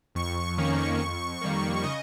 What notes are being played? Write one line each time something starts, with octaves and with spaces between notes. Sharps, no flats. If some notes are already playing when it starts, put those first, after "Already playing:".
F2 C#6
D#3 A#3 C#4
F2
D#3 G3 A#3
C#3 D#5